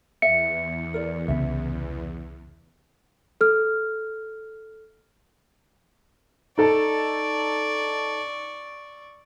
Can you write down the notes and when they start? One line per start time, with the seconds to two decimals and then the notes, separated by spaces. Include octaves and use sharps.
0.22 E2 E5 C#7
0.94 A#4 D5
1.28 C2 C#3 B3 E5
3.41 A4 F6
6.58 D#4 A4 D5 A5 C#6